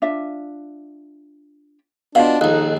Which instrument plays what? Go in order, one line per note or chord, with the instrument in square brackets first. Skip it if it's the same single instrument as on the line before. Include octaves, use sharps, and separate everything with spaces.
[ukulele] D4 F4 E5
[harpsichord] B2 [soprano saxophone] D4 [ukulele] F4 B4 F5
[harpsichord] A#1 D#2 [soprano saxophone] D#4 [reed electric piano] A4 D#5 F#6